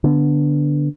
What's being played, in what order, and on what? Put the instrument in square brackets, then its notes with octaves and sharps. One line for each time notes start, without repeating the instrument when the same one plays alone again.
[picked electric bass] D3 B3